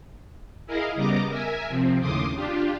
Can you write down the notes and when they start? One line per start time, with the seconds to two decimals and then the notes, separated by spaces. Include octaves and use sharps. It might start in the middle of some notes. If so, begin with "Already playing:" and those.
0.67 E4 G#4 A#4 D#5 F5
0.95 C#3 G3 B3 D#5 A#5 D6
1.29 A#4 E5 G#5
1.69 C3 F3 C4
2.01 D#2 A2 C#3 C6 D6 D#6
2.36 D4 F4 G4